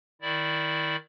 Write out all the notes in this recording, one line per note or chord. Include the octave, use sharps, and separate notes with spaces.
D#3 E4 D5